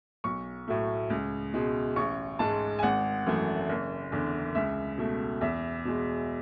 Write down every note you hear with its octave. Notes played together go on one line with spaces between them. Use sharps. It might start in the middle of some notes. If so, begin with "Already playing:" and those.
B1 C#6
A2 F#3 A3
C#2
B2 G#3
A1 C#6
G#2 G#3 A5
G#5
G#1 F#5
F#2 E3 A3
F#1
E2 D3
C#2 E5
B2 A3
E2 E5
B2 G#3